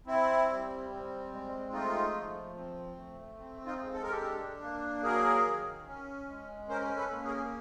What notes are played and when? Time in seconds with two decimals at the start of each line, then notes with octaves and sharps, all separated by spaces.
0.06 C4 E4
0.49 G3
0.90 C4
1.31 G#3
1.72 A3 D#4 F4
2.14 F3
2.55 C4
2.96 A3
3.38 C4
3.66 D#4 F4
3.80 G#3
3.94 A4
4.03 A#4
4.11 G4 A4
4.21 D4
4.62 A#3
5.03 F#3 G#4 A#4
5.44 D#3
5.86 C#4
6.28 G#3
6.69 C#4 A#4 C5
6.97 A4 B4
7.11 A#3
7.24 G#4 A#4